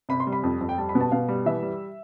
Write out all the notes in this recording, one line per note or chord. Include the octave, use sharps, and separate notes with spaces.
C3 B5
C6
G3
B5
F2
F2
G5
G3 A5
B5
B2
A5
B2 F5
G3
E3 E5
G3